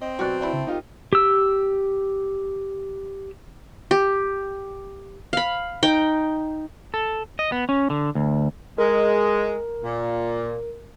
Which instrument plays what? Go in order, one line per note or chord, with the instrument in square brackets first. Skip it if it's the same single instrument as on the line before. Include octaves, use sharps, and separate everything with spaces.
[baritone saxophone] C4 [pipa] D#5
[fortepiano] B2 F#3 F#6 [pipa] F#4 G4 D5
[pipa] A3 D4 E4 [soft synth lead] D5
[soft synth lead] C#3
[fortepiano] D#4 F4 G4 [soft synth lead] A#4
[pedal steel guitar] G4 E6
[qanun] G4
F5 B5
D#4 G5
[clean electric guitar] A4
D#5
B3
C#4
D3
D2
[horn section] G#3 [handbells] A#4
[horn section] A#2